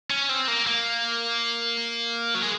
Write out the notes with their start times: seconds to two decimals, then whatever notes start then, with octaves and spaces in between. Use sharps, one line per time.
0.10 C#4
0.29 C4
0.48 A#3
0.67 A#3
2.35 F#3
2.42 G#3